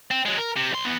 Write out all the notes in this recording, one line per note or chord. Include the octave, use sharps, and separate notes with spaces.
C4
F#3 G#3
A#4
C3
B1 C6
E2 B3